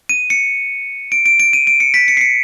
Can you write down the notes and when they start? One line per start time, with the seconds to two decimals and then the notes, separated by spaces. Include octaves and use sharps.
0.09 D#7
0.30 C#7
1.12 D7
1.26 D7
1.40 D7
1.53 D#7
1.67 D7
1.80 C#7
1.94 B6
2.08 C#7
2.17 C7
2.21 C#7